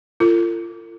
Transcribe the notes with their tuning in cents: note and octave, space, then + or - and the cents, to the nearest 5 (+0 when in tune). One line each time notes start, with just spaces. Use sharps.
F4 -30 A4 +45